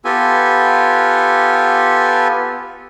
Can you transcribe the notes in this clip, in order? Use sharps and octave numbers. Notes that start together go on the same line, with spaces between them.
B3 F4 G4 A4 G#5